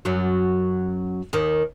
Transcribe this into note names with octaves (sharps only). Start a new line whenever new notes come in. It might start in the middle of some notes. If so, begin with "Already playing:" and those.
F#2 F#3
D#2 D#3